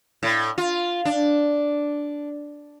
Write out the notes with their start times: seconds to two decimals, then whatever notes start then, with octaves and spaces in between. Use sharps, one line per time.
0.23 A2
0.58 F4
1.05 D4